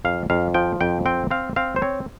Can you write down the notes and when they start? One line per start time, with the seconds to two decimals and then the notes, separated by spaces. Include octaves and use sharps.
0.05 F2 F5
0.30 F2 F5
0.54 F3 G5
0.81 F2 G5
1.06 C4 G5
1.31 C4 F5
1.56 C4 F5
1.76 C5
1.82 C4 C#5